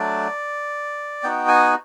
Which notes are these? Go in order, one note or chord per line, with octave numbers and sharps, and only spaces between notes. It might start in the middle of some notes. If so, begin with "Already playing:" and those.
Already playing: F#3 A3 D4 D5
B3 D#4 F#4 G5
G#5